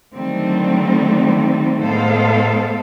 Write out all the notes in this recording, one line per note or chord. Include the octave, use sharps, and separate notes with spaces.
D3 D#3 F#3 G3 A3 C4
A2 G#3 B3 A4 C5 F5